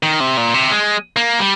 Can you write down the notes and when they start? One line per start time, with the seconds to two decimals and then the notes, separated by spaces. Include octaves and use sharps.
0.03 D#3
0.20 C3
0.37 A#2
0.54 C3
0.72 G#3
1.16 A#3
1.39 G3